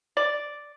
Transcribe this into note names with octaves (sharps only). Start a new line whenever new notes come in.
D5